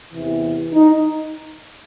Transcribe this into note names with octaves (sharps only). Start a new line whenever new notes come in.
E2 C3 E3
D#4